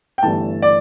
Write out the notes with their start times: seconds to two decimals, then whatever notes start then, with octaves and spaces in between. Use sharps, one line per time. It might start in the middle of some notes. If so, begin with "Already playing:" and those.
0.18 G5
0.23 G1 G2 E3 A3 A5
0.62 D5